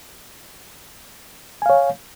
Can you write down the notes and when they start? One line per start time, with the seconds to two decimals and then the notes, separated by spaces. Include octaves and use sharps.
1.62 G#5
1.66 F5
1.70 C#5